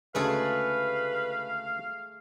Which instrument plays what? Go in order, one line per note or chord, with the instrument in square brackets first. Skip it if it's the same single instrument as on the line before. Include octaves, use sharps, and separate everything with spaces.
[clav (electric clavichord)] D2 C#3 G#3 [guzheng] A3 G#4 A4 [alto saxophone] B4 [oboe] F5